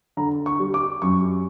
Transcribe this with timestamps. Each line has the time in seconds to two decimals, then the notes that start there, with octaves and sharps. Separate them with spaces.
0.17 D3 A#5
0.46 C#6
0.59 G3
0.74 D6
1.02 F#2 C#6